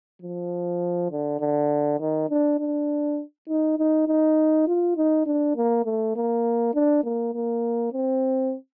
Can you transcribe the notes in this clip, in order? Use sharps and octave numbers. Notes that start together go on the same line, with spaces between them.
F3
D3
D3
D#3
D4
D4
D#4
D#4
D#4
F4
D#4
D4
A#3
A3
A#3
D4
A#3
A#3
C4